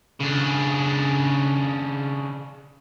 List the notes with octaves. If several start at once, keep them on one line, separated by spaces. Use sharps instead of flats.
C#3 D4